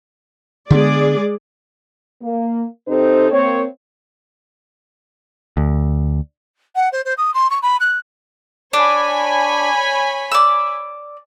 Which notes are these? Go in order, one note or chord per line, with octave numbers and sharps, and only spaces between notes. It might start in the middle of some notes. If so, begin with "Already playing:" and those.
D3 G#3 B3 G#4 D5
A#3
C3 C4 D#4 G4 A4 C5
A#3 C4 C#5
D2
F#5
C5
C5
D#6
C6
C#6
B5
F#6
D4 C#5 G#5 B5
D5 E6